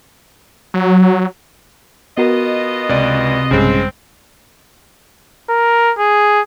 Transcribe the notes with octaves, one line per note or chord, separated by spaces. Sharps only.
F#3
B2 B3 F4 F#4 A#4 D#5
C#2 C3 D5
A#1 G2 C#3 G3 G#3 C4
A#4
G#4